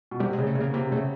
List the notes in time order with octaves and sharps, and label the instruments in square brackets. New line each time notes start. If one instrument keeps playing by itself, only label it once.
[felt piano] B2
[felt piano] C3 [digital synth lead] G3
[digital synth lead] G#3
[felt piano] C#3
[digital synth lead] A3
[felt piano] C#3
[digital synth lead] A#3
[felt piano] C3 [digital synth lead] A#3
[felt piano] C#3 [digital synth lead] A3